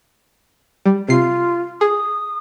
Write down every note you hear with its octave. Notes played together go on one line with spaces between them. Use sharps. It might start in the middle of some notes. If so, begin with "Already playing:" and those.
G3
C3 F4 C7
G#4 D#6